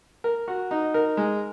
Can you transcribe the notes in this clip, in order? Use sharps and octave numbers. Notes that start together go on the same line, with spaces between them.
A#4
F#4
D#4
A#4
G#3